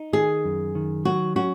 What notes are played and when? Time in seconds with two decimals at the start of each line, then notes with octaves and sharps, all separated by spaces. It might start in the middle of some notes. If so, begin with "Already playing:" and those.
Already playing: D#4
0.13 D#3 G#4
0.44 F#2
0.75 D#3
1.05 F#3 F#4
1.36 C#4 F#4